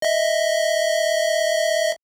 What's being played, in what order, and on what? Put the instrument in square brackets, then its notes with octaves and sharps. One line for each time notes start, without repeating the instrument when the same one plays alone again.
[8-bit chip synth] D#5 E5